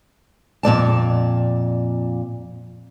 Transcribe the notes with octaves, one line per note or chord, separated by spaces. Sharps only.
F2 A#2 D5 A5